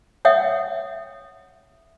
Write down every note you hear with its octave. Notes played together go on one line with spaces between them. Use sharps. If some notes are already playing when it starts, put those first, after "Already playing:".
C#5 E5 F#5 G5 D#6